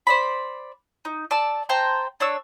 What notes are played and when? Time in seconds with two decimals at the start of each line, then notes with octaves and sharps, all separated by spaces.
0.07 C5 D5 B5
1.05 D#4
1.31 D5 A5 E6
1.69 C5 G5 A5 A#5
2.20 D4 C#5 E6